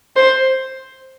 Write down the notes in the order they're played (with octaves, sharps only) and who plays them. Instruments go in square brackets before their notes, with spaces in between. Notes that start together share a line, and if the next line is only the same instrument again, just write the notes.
[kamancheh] C5